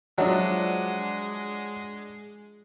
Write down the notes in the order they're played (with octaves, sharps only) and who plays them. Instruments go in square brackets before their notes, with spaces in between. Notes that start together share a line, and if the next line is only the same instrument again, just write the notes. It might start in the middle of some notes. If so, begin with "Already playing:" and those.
[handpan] F3 D#5 E5 [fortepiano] F#3 [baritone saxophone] G#3 [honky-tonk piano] D4 F#4